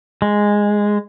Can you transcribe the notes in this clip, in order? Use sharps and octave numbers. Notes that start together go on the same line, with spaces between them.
G#3